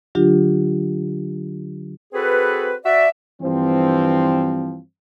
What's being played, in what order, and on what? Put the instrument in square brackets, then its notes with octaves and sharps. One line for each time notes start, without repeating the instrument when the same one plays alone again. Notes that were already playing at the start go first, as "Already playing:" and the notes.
[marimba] D3 F#3 D4 F4 G4
[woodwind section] C4 F#4 G#4 A4 B4
F#4 D5 E5
[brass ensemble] G2 E3 F3 C4